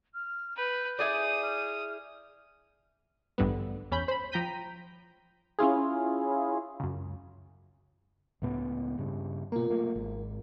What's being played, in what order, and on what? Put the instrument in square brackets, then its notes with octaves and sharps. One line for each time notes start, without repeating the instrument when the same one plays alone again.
[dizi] F6
[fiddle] B4 [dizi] G6
[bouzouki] E4 G#4 D5 [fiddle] D#6
[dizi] F6
[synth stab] A1 G2 D3 G3 B3
E2 C#4 B5 G6
C5 B5
F3 G5 A#5 G6 B6 D#7
[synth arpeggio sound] C#4 E4 F4 G#4
C#2 F#2
[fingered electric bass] C#2 A2 B3
G2 C#3
[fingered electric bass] B2 A#3 [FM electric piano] F4 A#4
[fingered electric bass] F#3 A3 A#3
G#1